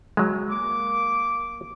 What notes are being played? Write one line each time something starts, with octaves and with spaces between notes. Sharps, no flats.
F#3 G#3
A#3 D6